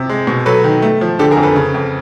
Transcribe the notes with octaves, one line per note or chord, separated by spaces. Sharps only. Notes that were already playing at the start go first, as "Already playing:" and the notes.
Already playing: C3
G#3
B2
F#3 A4 B4
D#3
A3
F3
D3 G4 A4
G#4 A#4
F2
A4 B4
C#3
F2